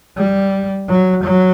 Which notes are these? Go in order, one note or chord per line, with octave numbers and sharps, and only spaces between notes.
G3
F#3
F#3